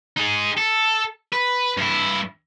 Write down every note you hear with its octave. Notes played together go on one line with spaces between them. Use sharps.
D#4 G#4
A4
B4
G2 E4